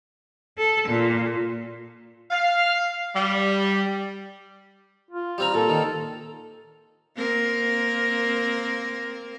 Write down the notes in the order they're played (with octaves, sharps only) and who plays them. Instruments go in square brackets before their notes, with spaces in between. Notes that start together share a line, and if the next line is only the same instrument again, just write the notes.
[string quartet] A4
A#2
[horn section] F5
G3
[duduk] F4
[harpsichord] G3 C4 A#5
[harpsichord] A#2 [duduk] A4
[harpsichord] D#3
[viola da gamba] A#3 C4 A#4